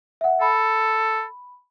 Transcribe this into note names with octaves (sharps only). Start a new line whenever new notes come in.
E5 F#5
A4 B5